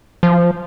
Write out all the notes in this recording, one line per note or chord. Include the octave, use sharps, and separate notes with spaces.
F3